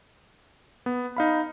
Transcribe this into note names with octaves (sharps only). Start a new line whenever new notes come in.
B3
D#4 F5 B5